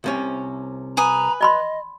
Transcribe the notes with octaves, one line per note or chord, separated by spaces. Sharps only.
C2 C3 C#4
B4 G#5 A#5 D#6
D5 D#5 B5 C6